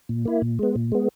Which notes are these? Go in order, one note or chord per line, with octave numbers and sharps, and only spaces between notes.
A#2
A#3 E4
A#2
G#3 B3
A#2
G#3 B3